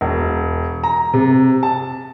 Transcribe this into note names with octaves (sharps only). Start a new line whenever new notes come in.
E1
A#5
C3
A5